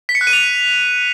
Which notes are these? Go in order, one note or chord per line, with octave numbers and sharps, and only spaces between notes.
B6
C#7
F#6
D#7
F7